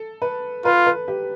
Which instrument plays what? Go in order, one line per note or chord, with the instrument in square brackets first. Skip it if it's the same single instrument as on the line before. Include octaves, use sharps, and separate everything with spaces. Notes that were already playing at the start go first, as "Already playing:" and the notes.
Already playing: [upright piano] A4
B4
[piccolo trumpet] F4 [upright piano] B4
[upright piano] B4
G4